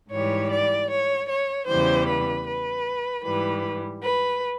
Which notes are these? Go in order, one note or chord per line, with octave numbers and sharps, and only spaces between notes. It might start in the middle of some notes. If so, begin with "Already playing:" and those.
G#2 E3 G3 C#5
D5
C#5
C#5
E2 C#3 E3 G3 C5
B4
B4
G#2 E3 G3 B4
B4